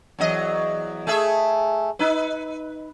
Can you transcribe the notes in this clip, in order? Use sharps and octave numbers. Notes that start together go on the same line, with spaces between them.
E2 F#3 D#5
A3 G#4 E5
D#4 B4